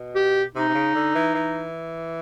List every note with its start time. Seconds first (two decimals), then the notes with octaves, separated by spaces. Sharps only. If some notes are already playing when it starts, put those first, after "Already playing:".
Already playing: B2
0.15 G4
0.55 C3 D#4
0.68 C3
0.75 C#3
0.95 D3
1.15 E3
1.35 E3